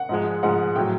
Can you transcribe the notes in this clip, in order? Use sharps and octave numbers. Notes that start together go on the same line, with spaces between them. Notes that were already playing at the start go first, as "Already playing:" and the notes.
Already playing: F#5
G#2 F3 G#3
G#2 F3 G#3 F#5
A2 F#3 G5